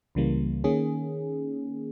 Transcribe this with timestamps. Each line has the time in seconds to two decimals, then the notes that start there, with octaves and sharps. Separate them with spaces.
0.15 C#2 C#3 E3 G3 A#3
0.64 D#3 A#3 C#4 G#4